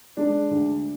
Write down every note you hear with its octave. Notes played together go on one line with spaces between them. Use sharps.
G#3 D4
D2